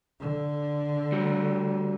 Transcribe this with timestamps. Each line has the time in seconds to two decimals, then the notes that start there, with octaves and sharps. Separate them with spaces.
0.20 D3
1.12 G3 F#4 G4